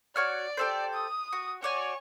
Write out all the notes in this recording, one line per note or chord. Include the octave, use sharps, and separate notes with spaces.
F#4 C#5 D5 F6
G4 A4 C5
D#6
F#4
F#4 C#5 D5 G#5